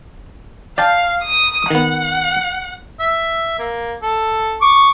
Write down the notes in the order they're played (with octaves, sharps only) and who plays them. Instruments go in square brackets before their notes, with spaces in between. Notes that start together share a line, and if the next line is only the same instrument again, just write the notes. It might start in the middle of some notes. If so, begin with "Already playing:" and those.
[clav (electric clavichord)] D5 G5 A5 [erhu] F5
[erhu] D#6
[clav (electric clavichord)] D#3 B3 [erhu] F#5
[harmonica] E5
A#3
A4
C#6 D6